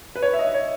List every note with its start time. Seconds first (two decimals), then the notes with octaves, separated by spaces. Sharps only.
0.16 B4
0.22 C#5
0.33 E5
0.39 D#5
0.54 C#5